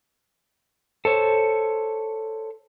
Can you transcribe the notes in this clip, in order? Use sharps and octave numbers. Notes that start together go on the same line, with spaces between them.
A4 C5 C#5